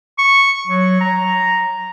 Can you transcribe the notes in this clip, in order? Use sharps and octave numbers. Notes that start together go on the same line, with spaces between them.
C#6
F#3
A#5